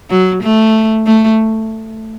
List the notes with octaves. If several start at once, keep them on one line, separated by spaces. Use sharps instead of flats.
F#3
A3
A3